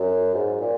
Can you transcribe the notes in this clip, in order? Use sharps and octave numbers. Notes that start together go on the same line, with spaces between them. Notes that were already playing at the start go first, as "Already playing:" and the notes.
Already playing: F#2
G#2
A#2